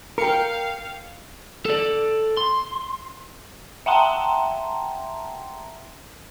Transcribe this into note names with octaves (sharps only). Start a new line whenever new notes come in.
A#4 F5 G5 C#7
A4 D5
C6
E5 F#5 G5 A5 A#5 C6